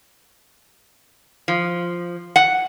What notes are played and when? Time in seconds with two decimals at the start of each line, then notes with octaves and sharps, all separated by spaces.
1.48 F3
2.36 F#5